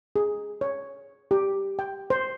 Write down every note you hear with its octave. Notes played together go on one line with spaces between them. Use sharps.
G#4
C#5
G4
G5
C5